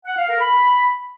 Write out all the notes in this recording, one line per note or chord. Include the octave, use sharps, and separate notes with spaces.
F#5
F5
A#4
B5